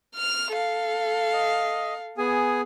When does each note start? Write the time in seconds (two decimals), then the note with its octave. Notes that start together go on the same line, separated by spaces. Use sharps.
0.15 F6 F7
0.55 A4 F5
1.33 D#5
2.18 B3 G#4 G#5